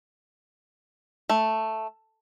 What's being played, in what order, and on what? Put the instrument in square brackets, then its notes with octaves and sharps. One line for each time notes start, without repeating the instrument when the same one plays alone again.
[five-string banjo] A3